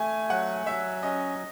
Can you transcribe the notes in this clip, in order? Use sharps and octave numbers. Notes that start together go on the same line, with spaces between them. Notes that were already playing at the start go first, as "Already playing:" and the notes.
Already playing: A3 G#5
F#3 F#5
F#3 E5
C#4 D#5